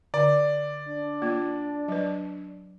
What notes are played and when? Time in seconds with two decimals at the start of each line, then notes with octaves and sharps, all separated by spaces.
0.14 D3 D5
0.88 D4
1.22 A#3 F4
1.88 F#3 B4